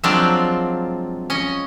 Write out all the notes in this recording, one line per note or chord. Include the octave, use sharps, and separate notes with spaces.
F3 F#3 G#3 C4 D4 F4
C#4 D#5